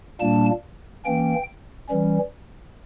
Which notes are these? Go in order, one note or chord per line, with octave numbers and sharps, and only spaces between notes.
A#2 G3 A#3 D4 A5
E3 A#3 C#4 G5
E3 G3 C#4